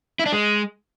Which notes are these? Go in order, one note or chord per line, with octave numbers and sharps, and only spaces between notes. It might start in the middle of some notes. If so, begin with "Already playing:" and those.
E4
D4
G#3